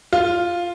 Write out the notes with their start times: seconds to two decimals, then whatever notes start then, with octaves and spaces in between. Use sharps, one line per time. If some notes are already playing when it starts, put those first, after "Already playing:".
0.13 F4